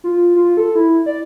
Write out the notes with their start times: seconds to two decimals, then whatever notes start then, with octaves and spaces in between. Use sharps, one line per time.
0.04 F4
0.36 F4
0.57 A4
0.75 E4
1.06 D5